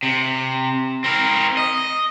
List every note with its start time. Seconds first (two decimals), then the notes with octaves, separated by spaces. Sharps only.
0.03 C3
1.04 C4 A#4
1.57 D#5